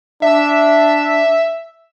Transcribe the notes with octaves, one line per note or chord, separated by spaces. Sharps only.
D4 E5